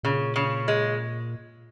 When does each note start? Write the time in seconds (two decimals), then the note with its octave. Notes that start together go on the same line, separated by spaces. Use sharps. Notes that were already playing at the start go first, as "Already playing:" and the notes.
0.03 A#2 C#3
0.36 C#3
0.68 G#3